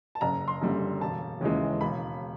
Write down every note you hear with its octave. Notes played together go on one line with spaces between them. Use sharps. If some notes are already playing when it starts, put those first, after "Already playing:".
A5
F#1 A#5
C6
F#2 D3 G3
E1 A5
D#2 C#3 E3 G#3
E1 B5